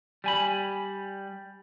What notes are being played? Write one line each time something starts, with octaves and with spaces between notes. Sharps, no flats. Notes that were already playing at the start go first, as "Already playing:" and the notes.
G3 G#5 B5